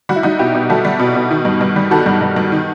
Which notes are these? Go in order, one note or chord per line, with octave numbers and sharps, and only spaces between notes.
G3 F#4
E4
G3 D#4 F#4
B2 E4 G4
B2
G3 F#4 A4
G3
B2
B2
D#3
G2
G2
G3
D#3 F#4 A4
G2
G2
G2
D#3